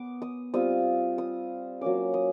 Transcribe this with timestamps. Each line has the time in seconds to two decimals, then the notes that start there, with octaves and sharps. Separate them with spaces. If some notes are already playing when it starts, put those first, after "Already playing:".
Already playing: B3 D6
0.22 D#6
0.54 G3 C4 F4 D#6
1.18 D#6
1.81 F#3 A#3 C#4 D6
2.14 D#6